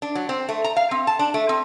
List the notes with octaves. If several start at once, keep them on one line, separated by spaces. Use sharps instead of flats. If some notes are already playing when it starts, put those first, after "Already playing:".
D4
F#3
C4
A3
A#5
F5
C4
A5
D4
A3
C4